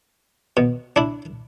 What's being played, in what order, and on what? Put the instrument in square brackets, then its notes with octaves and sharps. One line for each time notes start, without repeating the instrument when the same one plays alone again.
[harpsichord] B2
D4 E4